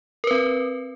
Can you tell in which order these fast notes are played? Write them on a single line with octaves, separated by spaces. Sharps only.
A#4 B4 C4